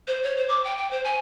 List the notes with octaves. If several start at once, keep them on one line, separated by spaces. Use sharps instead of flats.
C5
C#5
C5
D6
G5
G5
C5
G#5